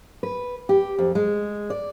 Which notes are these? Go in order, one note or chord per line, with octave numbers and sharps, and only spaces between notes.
B4
G4
F2
G#3
D5